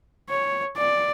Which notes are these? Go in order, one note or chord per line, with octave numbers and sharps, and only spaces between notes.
C#5
D5